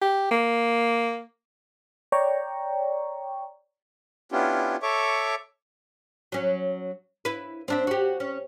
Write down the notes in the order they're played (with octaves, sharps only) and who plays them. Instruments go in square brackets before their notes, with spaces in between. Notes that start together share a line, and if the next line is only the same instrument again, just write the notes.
[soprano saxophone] G4
A#3
[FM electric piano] C#5 D5 G5 A#5 C#6
[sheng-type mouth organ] B3 C#4 D4 E4 F4 G4
A4 C#5 E5 C#6 D6
[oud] F#3 C#4
E4 B4
C4 D4 E5
F#4 G4
C#4